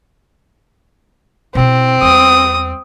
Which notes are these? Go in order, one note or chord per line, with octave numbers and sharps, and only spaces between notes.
B2 C4 E4
E2 G3 D#6